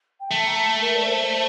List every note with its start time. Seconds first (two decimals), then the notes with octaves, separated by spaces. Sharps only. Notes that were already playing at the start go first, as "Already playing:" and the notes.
0.20 G5
0.31 A3 A5
0.47 A#5
0.56 A5
0.81 A#4
0.96 D5
1.06 C5